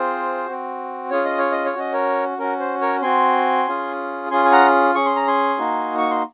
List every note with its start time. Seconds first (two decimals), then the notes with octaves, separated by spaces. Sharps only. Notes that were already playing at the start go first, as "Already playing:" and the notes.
Already playing: C4 F4 G#4 C5
0.46 C4 F#4
1.11 C#4 F4 G#4 C#5
1.25 D#5
1.38 C#5
1.52 D#5
1.65 C#5
1.74 C#4 F#4 D#5
1.93 A#4 C#5
2.38 C#4 F#4 A#4
2.60 C5
2.81 A#4 C#5
3.02 C4 F#4 G#5 C6
3.67 C#4 F4 G#4
4.30 C#4 F4 G#4 G#5 C6
4.45 G#5
4.52 F#5 A#5
4.95 C#4 G#4 C#6
5.06 C6
5.16 A#5
5.27 G#5 C6
5.58 A#3 D#4 F#4
5.98 C#6
6.10 C6